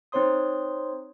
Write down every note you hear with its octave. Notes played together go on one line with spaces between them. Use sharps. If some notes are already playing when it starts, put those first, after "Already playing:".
C4 D#4 C5 C#5 C6 D#6